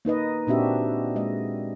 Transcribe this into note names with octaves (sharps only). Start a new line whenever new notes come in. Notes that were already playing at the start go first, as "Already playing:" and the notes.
A#3 D#4 B4 D#5
A#2 C4 D4 F#4 G4 E5
G#3 D#5